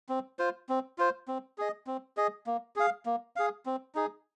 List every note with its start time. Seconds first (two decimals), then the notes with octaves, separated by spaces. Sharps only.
0.09 C4
0.39 F4 C5
0.69 C4
0.98 F4 C5
1.28 C4
1.58 G#4 D#5
1.87 C4
2.17 G#4 D#5
2.47 A#3
2.76 G#4 F5
3.06 A#3
3.36 G#4 F5
3.66 C4
3.95 D#4 G#4